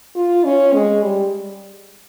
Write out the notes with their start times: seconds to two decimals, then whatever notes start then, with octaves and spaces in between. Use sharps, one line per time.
0.15 F4
0.44 C#4
0.74 G#3
1.03 G3